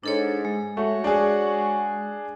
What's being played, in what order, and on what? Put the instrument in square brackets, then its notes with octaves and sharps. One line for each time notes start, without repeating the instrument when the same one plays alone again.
[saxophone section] G#2 [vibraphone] D4 A4 C#5
[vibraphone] G#3
[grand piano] A3 [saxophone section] F#4 C#5
[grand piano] D4 G#4